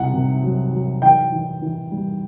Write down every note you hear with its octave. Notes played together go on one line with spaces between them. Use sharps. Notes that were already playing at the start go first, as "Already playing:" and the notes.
Already playing: C2 F#5
C3
F#3
F#3
E3 G5
E3
E3
G3